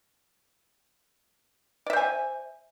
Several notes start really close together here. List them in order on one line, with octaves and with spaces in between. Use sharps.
D5 E5 C5 G#5